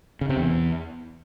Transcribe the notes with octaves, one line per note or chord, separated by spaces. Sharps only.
C#3
C3
E2